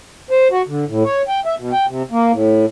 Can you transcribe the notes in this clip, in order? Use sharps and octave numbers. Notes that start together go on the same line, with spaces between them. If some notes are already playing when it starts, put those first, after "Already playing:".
C5
F#4
D3
A2
C#5
G5
E5
B2
G5
C3
A#3
A2